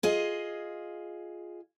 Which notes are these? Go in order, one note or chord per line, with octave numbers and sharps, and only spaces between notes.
F4 G#4 D#5